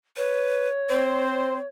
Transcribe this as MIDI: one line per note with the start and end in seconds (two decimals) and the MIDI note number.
0.17 0.68 71
0.17 1.67 73
0.90 1.58 60
0.90 1.57 72